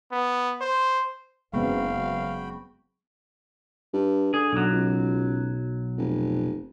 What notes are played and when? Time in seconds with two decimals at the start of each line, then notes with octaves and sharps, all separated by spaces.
0.12 B3
0.61 C5
1.54 F#1 G#3 B3 C4 F#4 F5 G5 B5
3.94 G2
4.34 D3 G#4
4.53 B1 F#3
4.72 C#2
5.97 F1